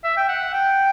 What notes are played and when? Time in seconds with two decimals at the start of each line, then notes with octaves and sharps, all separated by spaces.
0.04 E5
0.17 G5
0.29 F#5
0.53 G5